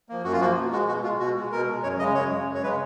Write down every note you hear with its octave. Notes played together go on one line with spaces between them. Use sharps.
F3 A#3
F#2 F#4
F4
F3 A#3 F#4
B2
G#3 F#4
B2 F#4
G#3 F4
B2 F#4
G#3
B2 A#4
G#3
F#2 C#5
C#3 G#3 D#5
F#2 C#5
C#3 G#3
F#2
C#5
C#3 G#3 B4